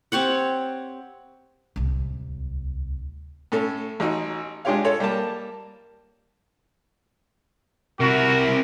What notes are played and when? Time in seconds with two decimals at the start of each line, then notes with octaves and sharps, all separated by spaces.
0.12 C4 G4 C#5 F#5
1.76 D1 C2
3.52 A2 C#4 A4
4.00 A1 D#4 F#4
4.65 G#3 D4 F4 G4 C#5 F5
4.84 F4 A4 C#5
5.00 G3 A#3 A5
8.00 C3 E4 F#4 A#4